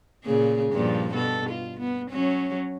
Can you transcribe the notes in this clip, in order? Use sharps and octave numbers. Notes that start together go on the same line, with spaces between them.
A#2 C#3 G#4
G2 A#2 F3
B2 A4
F4
B3
F#3 C#4